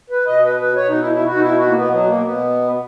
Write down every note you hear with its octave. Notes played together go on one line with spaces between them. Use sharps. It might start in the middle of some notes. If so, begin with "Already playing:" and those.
B4
B2 D#5
B4
B4
B2 C#5
D#4
E4
E4
B2 F#4
D#4
E4
F#4
A#3
B2 B3
F#3
A#3
B2 B3